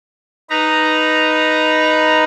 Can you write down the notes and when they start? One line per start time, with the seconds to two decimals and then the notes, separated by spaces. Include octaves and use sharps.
0.50 D#4 B4 A#5